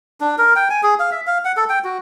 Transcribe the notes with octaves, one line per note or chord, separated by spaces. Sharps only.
D4
A#4
G5
G#5
G#4
F5
E5
F5
F#5
A4
G5
F#4